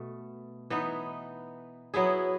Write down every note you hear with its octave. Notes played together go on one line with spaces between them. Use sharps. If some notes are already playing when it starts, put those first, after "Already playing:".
Already playing: B2 A3
E3 B3 D#4
F#3 B3 E4 G#4